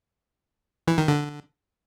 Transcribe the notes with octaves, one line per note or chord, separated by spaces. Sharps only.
E3
D#3
D3